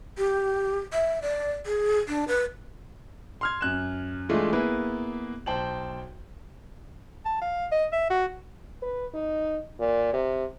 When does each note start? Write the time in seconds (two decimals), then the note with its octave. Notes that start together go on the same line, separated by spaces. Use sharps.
0.18 G4
0.93 E5
1.22 D5
1.66 G#4
2.08 D4
2.28 B4
3.41 C6 F6 G#6
3.61 F#2 F#6 E7
4.29 E3 G#3 A3 D4 F4
4.53 A#3 B3 E4 G#4 B4
5.46 B1 C5 G5 A5 F#7
7.25 A5
7.41 F5
7.72 D#5
7.92 E5
8.10 F#4
8.82 B4
9.14 D#4
9.80 A#2
10.13 C3